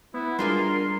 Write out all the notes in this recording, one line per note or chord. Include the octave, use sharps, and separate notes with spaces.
B3 E4
G3 D4 F4 G#4 A#4 C6